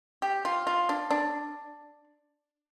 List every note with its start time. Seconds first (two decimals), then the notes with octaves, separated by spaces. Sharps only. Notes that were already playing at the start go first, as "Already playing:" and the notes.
0.22 G4
0.45 F4
0.67 F4
0.89 D4
1.11 D4